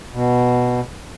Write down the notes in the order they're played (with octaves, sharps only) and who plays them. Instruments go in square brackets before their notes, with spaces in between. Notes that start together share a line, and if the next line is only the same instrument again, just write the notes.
[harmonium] B2